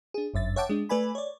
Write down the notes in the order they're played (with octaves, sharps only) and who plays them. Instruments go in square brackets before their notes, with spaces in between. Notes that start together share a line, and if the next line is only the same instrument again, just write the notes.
[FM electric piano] D4 G#4
G1 F#2 E5 A6
C#5 E5 F#5 G5 A5 D6
G#3 D4
A3 B4 D5 G#5 B5
C#5 D5